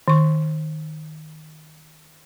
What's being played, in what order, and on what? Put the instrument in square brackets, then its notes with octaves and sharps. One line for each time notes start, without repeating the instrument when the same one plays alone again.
[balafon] D#3 C#6